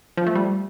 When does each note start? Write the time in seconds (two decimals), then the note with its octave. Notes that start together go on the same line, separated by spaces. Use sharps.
0.18 F3
0.27 A3
0.36 G3